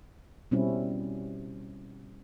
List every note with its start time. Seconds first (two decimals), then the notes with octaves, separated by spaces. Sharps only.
0.51 B2 G3 C4 C#4 E4